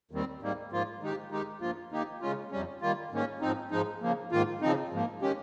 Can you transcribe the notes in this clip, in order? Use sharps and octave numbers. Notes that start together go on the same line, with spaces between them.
D#2 D#3 G3 C4
G#2 D#3 G3 A#3
G#2 F3 A#3 F4
D#3 G#3 D#4 G4
D#3 G#3 D#4 G4
G2 F3 A#3 F4
D#3 A#3 D#4 G4
C#3 G#3 C#4 F4
F2 C3 G3 C#4
D#3 G3 A#3 F4
G#2 D#3 A#3 C#4
G#2 F3 C4 D#4
G#2 F3 G#3 D#4
C#3 F3 A#3
G#2 D#3 A#3 F4
C#3 F3 C4 D#4
G#2 F3 A#3
D#3 G#3 C#4 G4